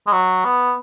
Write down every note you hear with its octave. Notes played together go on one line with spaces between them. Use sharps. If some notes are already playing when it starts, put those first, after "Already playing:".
G#3
F#3
B3